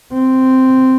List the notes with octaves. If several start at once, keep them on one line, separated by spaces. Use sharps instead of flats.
C4